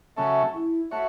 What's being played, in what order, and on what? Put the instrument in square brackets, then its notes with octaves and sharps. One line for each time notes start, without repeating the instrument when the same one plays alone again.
[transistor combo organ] C#3 F#3 A3 C#4 A4 [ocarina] E5
[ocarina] E4
[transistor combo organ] A3 F#4 C#5 [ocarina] E5